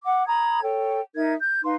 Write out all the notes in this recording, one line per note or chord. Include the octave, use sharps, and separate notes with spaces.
F#5 D6
A#5 B5 D#6 G#6
A4 C#5 G5
D#4 A#4 E5 G#6
G6
D#4 B4 F5 C6